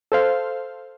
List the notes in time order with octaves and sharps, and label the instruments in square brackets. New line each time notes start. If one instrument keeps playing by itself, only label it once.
[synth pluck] A4 C5 F5